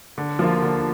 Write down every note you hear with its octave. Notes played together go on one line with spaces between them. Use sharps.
D3
F3 A#3 F4
D3